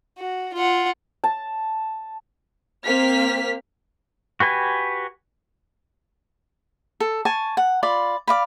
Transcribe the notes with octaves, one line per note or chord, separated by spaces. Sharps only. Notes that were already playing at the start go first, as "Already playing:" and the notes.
F#4
F4 F#5
A5
A#3 C4 F6 B6
F#4 G4 B4 G#5
A4
G#5 A5 C#6
F#5
F4 D5 B5
D5 F5 B5